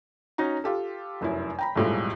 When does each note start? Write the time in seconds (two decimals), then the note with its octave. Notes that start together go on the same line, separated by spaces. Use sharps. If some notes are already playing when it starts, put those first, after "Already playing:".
0.38 C#4 D#4 F#4 A#5
0.64 F4 G4 A4
1.21 F1 F#2 E4
1.59 G5 A#5 B5
1.76 B1 F2 A2 F3 G3 G#3